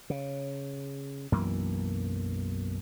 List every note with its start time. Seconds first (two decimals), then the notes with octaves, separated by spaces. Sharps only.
0.10 C#3
1.32 B1 F#2 E3 A#3